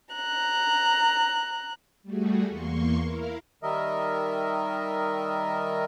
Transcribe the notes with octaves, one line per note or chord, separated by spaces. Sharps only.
A#5 F#6
G3 A3 F#4 G#4
E2 A#3 C6 C#6
E4 A#4 F5
D#3 G3 A#4 D#5 E5